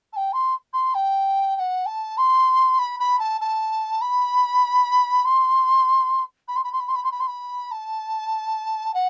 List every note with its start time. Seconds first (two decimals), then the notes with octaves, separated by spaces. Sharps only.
0.13 A5
0.16 G5
0.32 C6
0.73 C6
0.94 G5
1.56 G5
1.59 F#5
1.86 A5
2.17 C6
2.78 B5
2.99 B5
3.19 A5
3.41 A5
4.01 B5
5.24 C6
6.48 B5
6.56 C6
6.64 B5
6.72 C6
6.80 B5
6.88 C6
6.95 B5
7.03 C6
7.11 B5
7.20 C6
7.27 B5
7.71 A5
8.94 F#5